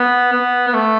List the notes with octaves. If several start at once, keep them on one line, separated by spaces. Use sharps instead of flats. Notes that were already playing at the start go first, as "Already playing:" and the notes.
Already playing: B3
B3
B3
A3